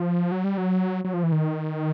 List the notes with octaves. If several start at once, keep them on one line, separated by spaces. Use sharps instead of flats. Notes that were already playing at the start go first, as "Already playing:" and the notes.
Already playing: F3
F#3
G3
F#3
F#3
F3
E3
D#3